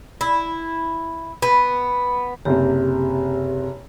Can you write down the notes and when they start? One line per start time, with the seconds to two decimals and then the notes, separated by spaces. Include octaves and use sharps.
0.21 E4
1.42 B3
2.45 F#1 C3 G4